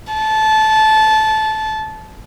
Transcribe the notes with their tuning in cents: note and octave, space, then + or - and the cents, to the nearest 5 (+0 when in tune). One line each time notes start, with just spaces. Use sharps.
A5 -20